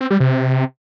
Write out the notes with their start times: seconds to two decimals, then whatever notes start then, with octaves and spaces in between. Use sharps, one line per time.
0.01 C4
0.10 G3
0.20 C3